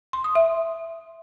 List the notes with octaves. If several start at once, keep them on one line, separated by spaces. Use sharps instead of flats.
C6
D#6
E5